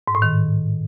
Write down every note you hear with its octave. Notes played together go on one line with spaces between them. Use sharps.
G#2
A2
D#3